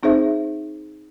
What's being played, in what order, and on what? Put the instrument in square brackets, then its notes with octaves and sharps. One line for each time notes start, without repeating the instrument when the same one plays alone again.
[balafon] C4 D#4 G#4 C5 E5